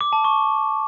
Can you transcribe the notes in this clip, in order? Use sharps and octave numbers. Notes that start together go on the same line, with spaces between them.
D6
A5
C#6